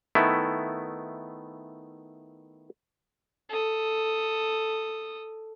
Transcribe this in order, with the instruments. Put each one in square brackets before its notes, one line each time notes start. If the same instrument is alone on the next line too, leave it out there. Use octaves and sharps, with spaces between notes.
[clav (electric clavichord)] D#3 A3 B3 E4
[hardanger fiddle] A4 D#6